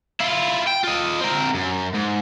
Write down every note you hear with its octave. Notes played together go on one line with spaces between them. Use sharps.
E4 F4
G5
F4 D#5
C4 A#4
F#2
G#2